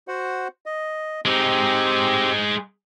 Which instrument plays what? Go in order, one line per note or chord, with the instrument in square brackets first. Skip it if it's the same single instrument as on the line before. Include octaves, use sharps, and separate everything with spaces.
[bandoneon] F#4 C5 F#5
D#5
[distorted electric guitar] G#3 D#4 [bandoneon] C4 G4